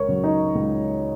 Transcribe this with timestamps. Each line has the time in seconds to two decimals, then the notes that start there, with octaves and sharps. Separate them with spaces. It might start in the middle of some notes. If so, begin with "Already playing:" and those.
Already playing: C#2 A#4 C#5 C#6
0.08 C#3 F#3
0.24 D#4 D#5
0.55 C#2